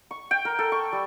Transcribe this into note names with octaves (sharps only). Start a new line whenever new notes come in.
C#6
G5
A#4
A4
C#6
G3